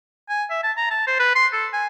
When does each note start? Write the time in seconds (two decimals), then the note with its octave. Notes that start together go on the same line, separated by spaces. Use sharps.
0.29 G#5
0.50 E5
0.63 A5
0.77 A#5
0.91 A5
1.07 C5
1.19 B4
1.35 C6
1.53 A4
1.73 G#5